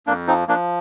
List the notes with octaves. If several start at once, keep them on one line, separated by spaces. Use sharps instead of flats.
F2 A#3 D4
F3 C4 D#4
F3 A#3 D4